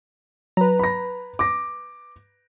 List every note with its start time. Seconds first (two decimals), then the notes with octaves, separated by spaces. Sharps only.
0.57 F#3 B4 A#5
0.79 B5 A#6
1.39 D6 A#6